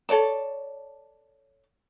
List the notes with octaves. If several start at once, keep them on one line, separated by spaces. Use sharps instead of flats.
A4 C#5 D5 A5